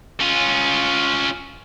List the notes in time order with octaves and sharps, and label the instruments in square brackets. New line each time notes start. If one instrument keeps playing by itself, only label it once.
[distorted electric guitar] C#4 F4